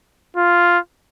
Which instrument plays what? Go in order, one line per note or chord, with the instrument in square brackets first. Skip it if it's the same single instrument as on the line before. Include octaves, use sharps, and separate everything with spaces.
[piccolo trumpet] F4